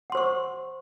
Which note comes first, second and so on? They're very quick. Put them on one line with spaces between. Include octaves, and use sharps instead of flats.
F#5 C6 C5 C#6